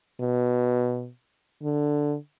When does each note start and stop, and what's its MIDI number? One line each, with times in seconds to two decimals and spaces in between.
0.20 1.09 47
1.63 2.16 50